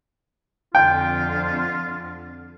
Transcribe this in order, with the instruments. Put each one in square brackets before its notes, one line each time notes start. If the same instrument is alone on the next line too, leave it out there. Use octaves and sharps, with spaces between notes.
[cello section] F2 D3 [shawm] F4 [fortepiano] G5